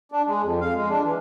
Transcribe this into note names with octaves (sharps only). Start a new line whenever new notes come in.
D4
G#3
F2
F5
G#3
D4
E3